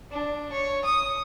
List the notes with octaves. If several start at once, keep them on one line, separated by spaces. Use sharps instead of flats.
D4
C#5
D#6